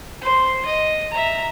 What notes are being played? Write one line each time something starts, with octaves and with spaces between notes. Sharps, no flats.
C5 C6
D#5
E5 A#5